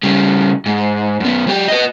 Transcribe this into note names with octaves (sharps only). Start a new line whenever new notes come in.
C#3 G3
G#2
F#2 B3
F#3 G4
B4 D#5